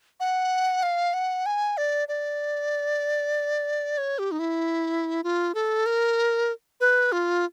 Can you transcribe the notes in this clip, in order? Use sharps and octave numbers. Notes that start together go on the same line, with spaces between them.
F#5
F5
F#5
G#5
D5
D5
C#5
G4
D#4
E4
F4
A4
A#4
B4
F4